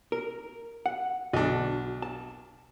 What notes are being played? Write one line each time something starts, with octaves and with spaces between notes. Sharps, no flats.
A#4
F#5
B1 D4 F#4
A5